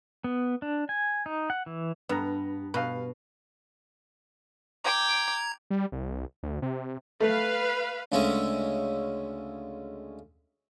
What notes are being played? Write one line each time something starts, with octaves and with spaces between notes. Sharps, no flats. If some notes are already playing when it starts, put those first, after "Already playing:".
B3
D4
G#5
D#4
F#5
E3
G2 B3 A#5
B2 B4 F5
G5 A#5 D6 G#6
G3
C2
D2
C3
A3 B4 F5
D2 C#3 G#3 C#4 E5